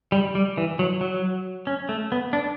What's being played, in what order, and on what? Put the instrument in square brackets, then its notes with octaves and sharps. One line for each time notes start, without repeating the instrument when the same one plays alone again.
[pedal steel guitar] G3
G3
E3
F#3
F#3
C#4
A3
B3
D4